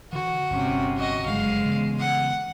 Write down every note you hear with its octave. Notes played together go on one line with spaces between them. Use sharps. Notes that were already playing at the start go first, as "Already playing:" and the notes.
D3 E3 F#4
G1 C3 C#4
F#4 D#5
F#1 G2 C3 G#3 F5
C#3 E3 B3
F#5